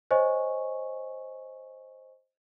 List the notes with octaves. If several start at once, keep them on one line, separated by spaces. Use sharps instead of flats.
C5 C#5 D#5 G#5 C#6